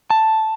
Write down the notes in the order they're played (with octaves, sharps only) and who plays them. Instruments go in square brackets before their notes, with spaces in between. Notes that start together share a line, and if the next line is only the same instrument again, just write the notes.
[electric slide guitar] A5